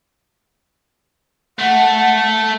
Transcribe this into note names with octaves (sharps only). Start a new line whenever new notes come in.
A3 F#5